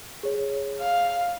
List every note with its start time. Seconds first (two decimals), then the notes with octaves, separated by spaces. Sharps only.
0.23 G#4 C#5
0.79 F5